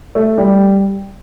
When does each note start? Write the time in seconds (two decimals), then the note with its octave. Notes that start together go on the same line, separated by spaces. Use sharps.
0.15 A3
0.38 G3